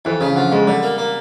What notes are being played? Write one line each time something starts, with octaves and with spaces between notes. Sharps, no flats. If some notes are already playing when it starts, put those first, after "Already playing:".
F2 E3
C#3 F3
D3 F3
F2 G#3
D3 G3
A#3
A#3